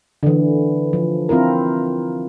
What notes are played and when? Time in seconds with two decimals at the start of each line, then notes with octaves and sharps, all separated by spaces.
0.23 D3 E3
0.93 F3
1.29 C4 E4 F4 A#4